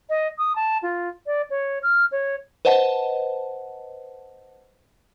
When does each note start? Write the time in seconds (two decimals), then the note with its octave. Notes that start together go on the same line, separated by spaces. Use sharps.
0.09 D#5
0.38 D#6
0.56 A5
0.83 F4
1.26 D5
1.50 C#5
1.83 F6
2.12 C#5
2.65 B4 C5 D#5 F#5 A5